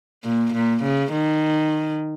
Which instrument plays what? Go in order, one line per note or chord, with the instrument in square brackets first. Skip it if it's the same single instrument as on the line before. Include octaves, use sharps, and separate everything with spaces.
[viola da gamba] A#2
A#2
C#3
D#3